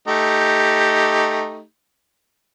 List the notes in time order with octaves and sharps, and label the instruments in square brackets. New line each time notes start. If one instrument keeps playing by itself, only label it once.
[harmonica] A3 D#4 G4